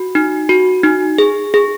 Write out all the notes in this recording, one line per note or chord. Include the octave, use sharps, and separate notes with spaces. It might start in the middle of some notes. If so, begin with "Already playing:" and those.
Already playing: F#4
D#4
F#4
D#4
G#4
G#4